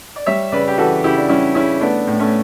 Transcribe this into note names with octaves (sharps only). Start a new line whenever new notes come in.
D5
G3 C#5 E5
C#3 B4 D5
G4
E3 F#4 A4
C#3 E4 G4
D4
G3 C#4 E4
C#3 C#4 E4
A3 B3 D4
A2
A3 C#4